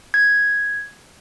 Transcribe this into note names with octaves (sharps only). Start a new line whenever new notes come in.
G#6